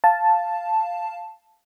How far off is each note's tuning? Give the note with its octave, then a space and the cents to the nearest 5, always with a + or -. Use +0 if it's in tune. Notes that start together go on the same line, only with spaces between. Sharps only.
F5 +0 A5 +0